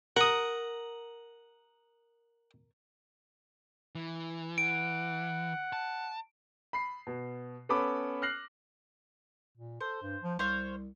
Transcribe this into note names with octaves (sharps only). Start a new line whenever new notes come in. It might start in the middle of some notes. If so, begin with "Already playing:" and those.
A#4 F#5 D#6
E3
F#5 D7
A5
B5 C7
B2
B3 C#4 A4 B5 D6
F6 F#6 A#6 C7 F#7
A#2
A4 C5
G2
F3
C2 C5 C#5 F5